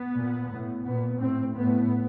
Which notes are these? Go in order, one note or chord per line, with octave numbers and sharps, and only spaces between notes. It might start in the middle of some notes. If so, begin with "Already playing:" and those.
Already playing: B3
A#2
A2
A#2 B3
A2 C4
A2 B3